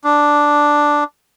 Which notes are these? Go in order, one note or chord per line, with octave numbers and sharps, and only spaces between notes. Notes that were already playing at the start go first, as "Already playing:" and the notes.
D4